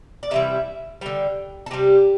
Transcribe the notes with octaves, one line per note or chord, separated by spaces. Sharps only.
D5
C3 E3 G3 E5
D3 G3 G5
A4
C3 G3 G4